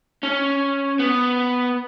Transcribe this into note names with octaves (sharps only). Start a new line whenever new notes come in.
C#4
B3